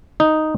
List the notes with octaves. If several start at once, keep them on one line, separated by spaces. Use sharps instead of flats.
D#4